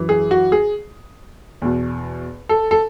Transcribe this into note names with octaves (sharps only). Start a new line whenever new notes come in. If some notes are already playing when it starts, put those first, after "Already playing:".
Already playing: F#2 E3
G#4
F#4
G#4
E2 B2
A4
A4